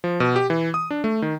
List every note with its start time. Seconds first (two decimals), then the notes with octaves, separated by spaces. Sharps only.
0.04 F3
0.20 B2
0.36 G4
0.50 E3
0.74 D#6
0.91 D4
1.04 A3
1.22 D#3